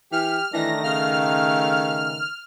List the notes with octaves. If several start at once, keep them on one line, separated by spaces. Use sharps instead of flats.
E3 G4 F6
D#3 E3 A3 D4 A#6
C#3 F5 F6